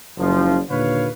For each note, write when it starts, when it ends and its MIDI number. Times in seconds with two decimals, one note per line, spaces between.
0.18 0.58 30
0.18 0.58 53
0.70 1.09 39
0.70 1.09 46
0.70 1.09 50
0.70 1.09 71
0.70 1.09 73
0.70 1.09 77